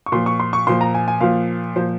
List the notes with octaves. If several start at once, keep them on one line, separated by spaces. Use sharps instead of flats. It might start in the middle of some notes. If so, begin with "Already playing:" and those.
C#6
A#2 F3 C6
C#6
C6
C#6
A#2 F3 C6
A#5
G#5
G#5
A#2 F3 F5
A#2 F3 C5